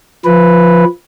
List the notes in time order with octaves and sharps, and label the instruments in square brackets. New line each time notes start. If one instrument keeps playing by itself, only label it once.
[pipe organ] F3 B4